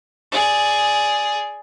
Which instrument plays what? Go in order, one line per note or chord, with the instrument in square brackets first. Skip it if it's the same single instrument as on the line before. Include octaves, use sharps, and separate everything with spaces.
[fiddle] G#4 D5